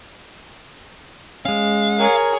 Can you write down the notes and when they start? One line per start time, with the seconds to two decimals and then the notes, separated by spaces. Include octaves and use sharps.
1.45 G#3 C#4 F5
2.00 G#4 A#4 C#5